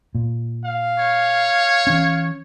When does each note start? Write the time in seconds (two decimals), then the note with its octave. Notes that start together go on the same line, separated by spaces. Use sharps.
0.15 A#2
0.65 F5
0.99 C#5
1.87 E3 C#4